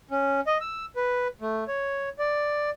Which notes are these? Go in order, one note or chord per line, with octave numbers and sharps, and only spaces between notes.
C#4
D#5
E6
B4
A3
C#5
D5